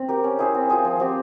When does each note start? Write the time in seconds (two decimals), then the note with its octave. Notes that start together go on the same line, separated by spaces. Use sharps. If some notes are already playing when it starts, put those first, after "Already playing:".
Already playing: C4
0.09 G4 A#4
0.24 C#4
0.39 E4 G#4 C5
0.55 C4
0.69 F4 G#4 C5
0.85 F3
1.00 C4 G4